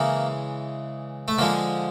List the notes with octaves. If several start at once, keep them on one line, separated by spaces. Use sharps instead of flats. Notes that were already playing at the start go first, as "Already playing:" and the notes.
Already playing: C#3 E3 G#3 A#3
A3
D3 F3 G#3 A#3